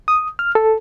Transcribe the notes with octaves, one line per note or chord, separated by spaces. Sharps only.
D#6
F6
A4